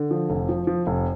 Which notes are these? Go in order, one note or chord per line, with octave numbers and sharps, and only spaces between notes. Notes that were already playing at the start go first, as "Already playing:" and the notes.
Already playing: D3
F3
F1
F3
F3
F1